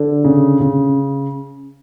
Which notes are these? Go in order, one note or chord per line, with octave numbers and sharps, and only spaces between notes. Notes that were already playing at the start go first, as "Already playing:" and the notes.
Already playing: D3
C#3
C#3